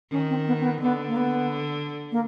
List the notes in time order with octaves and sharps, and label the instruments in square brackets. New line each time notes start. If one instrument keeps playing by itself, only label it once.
[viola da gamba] D#3 [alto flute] C#4
[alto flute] C4
B3
C4
B3
[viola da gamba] D3 [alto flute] B3
[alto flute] A#3
B3
A#3